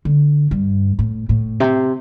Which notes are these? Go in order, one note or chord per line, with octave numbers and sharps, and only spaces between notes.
D3
G2
A2
A2
C3